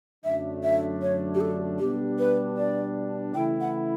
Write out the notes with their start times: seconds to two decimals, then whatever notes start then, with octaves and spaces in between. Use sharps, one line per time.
0.24 F#2 D3 F#3 A3 D4 E5
0.63 E5
1.02 C#5
1.35 G4
1.41 A4
1.79 B2 G3 B3 D4 G4
2.19 B4
2.57 D5
3.34 C#3 E3 A3 E4 G5
3.61 F#5